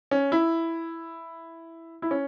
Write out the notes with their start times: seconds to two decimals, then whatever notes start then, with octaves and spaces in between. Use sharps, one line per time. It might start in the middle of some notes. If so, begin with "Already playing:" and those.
0.11 C#4
0.32 E4
2.02 E4
2.11 C#4